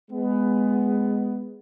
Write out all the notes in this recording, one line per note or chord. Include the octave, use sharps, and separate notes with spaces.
G#3 B3